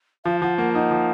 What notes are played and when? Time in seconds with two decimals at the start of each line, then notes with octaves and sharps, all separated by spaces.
0.25 F3 F5
0.42 F3 F#5
0.58 A#3 F#5
0.74 D#4 F#5
0.91 F3